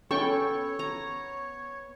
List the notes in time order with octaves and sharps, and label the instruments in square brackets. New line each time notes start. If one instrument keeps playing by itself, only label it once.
[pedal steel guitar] B3 B5 [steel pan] C#4 G5 C#6 [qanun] A4 [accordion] C#5
[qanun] A#5